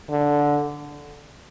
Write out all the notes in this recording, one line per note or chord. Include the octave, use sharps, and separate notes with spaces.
D3